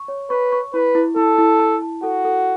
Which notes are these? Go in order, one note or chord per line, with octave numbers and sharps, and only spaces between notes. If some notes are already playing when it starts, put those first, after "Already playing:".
Already playing: C#6
C#5
B4 C#6
C#6
E4 B4
E4
E4 A4
E4
A5
A5
F#4 A4
A4